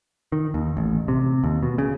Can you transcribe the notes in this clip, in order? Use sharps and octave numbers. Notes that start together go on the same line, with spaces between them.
D#3
D#2
A1
C3
D#2
B2
C#3